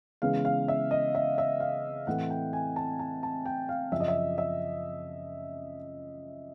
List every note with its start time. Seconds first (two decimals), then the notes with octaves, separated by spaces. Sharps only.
0.22 C#3 E3 G#3 B3 F5
0.45 F5
0.68 E5
0.91 D#5
1.15 E5
1.38 E5
1.60 F5
2.07 A2 E3 A3 C4 F#5
2.30 G5
2.53 G#5
2.76 A5
2.99 A5
3.23 A5
3.45 G5
3.69 F5
3.92 F#2 C#3 F3 E5
4.00 D#5
4.08 E5
4.38 E5